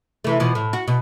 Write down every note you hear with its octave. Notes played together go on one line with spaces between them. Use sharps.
C3 E3 A3
B2 E3 F3
A2
F#4
B2